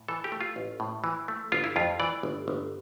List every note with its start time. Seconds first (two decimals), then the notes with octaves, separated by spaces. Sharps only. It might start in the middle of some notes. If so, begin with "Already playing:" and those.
Already playing: A2
0.08 E3 A4
0.24 G4
0.32 A3
0.41 F4
0.56 A1
0.80 A2
1.04 E3
1.28 A3
1.52 G1 F4
1.64 E4
1.76 F2 F4
2.00 E3 D5
2.23 G1
2.48 G1